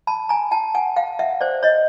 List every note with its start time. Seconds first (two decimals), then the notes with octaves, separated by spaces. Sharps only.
0.07 A5 B5
0.29 G#5 A#5
0.51 G5 A5
0.75 F#5 G#5
0.96 F5 G5
1.19 E5 F#5
1.41 C5 D5
1.63 C#5 D#5